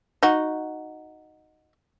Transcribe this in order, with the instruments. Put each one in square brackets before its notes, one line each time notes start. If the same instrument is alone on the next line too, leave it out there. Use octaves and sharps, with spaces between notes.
[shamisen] D#4 F#4